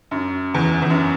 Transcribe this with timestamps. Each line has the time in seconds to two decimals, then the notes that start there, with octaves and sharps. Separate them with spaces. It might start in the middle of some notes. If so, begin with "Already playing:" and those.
0.11 F#2
0.54 E2
0.82 E2
0.90 F#2